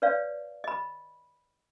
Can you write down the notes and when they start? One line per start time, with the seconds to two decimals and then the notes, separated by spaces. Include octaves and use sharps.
0.02 B4 C#5 D5 F5
0.64 D#5 B5